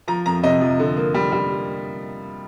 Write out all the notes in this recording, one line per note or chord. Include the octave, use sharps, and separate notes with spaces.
F3 A#5
F2 A#5
C3 D#5
F3
D3
A#3
G3
G3